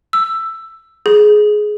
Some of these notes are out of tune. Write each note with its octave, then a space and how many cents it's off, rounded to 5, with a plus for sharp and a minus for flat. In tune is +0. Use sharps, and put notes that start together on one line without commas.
E6 +10
G#4 +15